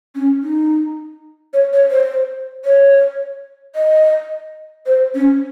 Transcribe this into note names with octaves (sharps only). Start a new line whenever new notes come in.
C#4
D#4
C#5
C#5
C5
C#5
D#5
C5
C#4